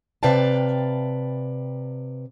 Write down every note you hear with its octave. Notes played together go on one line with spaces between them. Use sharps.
C3 B4 D5 F5 G5 A5